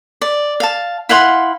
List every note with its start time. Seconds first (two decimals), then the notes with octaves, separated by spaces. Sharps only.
0.21 D5
0.60 F5 A5
1.09 E4 F5 F#5 C6